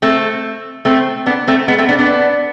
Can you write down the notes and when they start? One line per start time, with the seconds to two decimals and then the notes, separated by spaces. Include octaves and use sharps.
0.02 A3 C4
0.85 A3 C4
1.26 B3 D4
1.48 A3 C4
1.68 G#3 B3
1.78 A3 C4
1.88 B3 D4
1.99 B3 D4